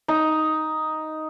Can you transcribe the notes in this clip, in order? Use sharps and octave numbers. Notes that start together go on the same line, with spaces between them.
D#4